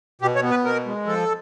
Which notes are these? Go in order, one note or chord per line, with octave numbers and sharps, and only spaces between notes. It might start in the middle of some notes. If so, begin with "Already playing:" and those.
B2 G4
C#5
B3
B4
B2 A#4
G#3
F3 A4